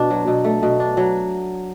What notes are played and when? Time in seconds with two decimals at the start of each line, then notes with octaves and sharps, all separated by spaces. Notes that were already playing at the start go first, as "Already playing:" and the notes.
Already playing: B2 D4
0.10 F#3
0.27 B2
0.44 A3
0.63 B2
0.80 D4
0.97 F#3